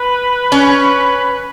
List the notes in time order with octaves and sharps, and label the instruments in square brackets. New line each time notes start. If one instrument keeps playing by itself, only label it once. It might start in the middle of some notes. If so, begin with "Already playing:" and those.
Already playing: [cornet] B4
[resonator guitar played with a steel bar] C#4